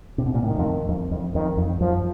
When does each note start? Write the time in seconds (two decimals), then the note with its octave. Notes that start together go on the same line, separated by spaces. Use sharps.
0.18 C3
0.26 B2
0.34 A#2
0.43 A2 D#3
0.58 F2
0.89 F2
1.11 F2
1.34 F2 D#3
1.57 F2
1.80 F#2 F3